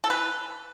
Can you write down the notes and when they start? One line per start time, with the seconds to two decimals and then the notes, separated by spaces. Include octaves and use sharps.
0.04 A4
0.10 E3 B4